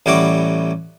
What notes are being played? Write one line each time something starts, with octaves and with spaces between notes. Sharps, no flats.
A1 G3 E4 F#4 D6